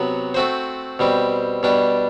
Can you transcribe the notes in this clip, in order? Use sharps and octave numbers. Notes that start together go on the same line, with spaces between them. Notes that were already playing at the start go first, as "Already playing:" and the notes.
Already playing: C3 F#3 B3 F#4
A3 C4 F#4 C5
B2 G3 C4
B2 G3 D4